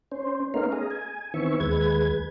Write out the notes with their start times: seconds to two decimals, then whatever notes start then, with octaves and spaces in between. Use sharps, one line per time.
0.11 C#4 C5
0.54 A3 B3 C#4 D#4 A#4 F5
0.72 G#4 D#5
0.91 G#5
1.34 D#3 E3 B3 C4 E5 C#6
1.60 D#2 G#3 B4 G#6